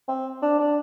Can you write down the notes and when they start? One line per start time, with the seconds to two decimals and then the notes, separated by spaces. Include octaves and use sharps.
0.08 C4
0.42 D4
0.59 D4